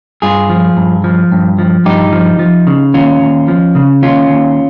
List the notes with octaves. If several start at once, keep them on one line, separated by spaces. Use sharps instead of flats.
G2 F4 G#4
F3
G2
F3
G2
F3
G2 D#4 G4
F3
F3
C#3
D#2 C#4 F4
D#2
F3
C#3
D#2 C#4 F4
D#2